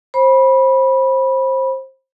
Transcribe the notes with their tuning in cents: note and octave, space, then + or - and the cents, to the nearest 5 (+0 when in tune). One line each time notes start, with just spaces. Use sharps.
C5 +20 B5 -15